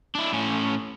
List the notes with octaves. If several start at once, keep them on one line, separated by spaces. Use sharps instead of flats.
D4 E4
A2 C#4